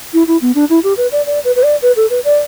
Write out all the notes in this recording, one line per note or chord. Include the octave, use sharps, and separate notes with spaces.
E4
E4
B3
D4
E4
G4
B4
D5
D5
B4
B4
D5
B4
A4
B4
D5